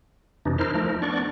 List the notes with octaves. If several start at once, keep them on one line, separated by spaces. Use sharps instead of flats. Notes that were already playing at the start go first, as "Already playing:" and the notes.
F2 C3 E3 D4 D#4
D#4 E4 A#4 C5 F6
F3 A3 D#4 A#4
B3 D4 D5 C#6